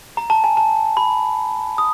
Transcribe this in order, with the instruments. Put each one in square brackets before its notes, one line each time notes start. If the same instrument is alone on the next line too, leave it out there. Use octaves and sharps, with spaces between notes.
[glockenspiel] A#5
A5
G#5
A5
B5
D#6